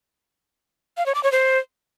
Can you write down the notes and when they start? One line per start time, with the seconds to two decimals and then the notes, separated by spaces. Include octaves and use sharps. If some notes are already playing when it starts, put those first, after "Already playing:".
0.97 F5
1.06 C#5
1.15 D6
1.23 C#5
1.32 C5